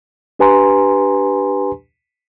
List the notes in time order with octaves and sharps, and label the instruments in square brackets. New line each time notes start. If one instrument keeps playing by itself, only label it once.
[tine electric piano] D4 G4 B4 G#5 A#5 C6